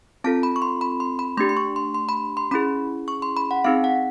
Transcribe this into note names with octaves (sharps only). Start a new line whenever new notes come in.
C4 F4 A4 A5
B5
C#6
C6
B5
C6
B5
A3 D4 G4 C6
C6
C#6
C6
C6
B5
C6
C#4 E4 G#4 B5
C#6
C6
B5
F#5
C4 D#4 G#4 F5
F#5